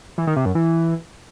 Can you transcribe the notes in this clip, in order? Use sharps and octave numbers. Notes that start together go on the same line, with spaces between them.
E3
D#3
C3
F#2
E3